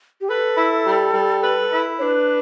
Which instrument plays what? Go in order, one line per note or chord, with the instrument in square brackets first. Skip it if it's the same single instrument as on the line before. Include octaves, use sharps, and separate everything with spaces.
[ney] G4
[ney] A4 [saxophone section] B4
[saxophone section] E4
G3
G3
B4
E4
[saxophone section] D4 [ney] B4 C#5